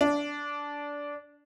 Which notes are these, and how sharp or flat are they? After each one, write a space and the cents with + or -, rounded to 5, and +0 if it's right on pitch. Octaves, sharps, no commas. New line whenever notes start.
D4 -15